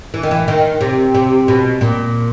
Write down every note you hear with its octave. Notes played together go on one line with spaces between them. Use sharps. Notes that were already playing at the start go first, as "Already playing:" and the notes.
E3
D#3
E3
D#3
C3
C3
B2
A#2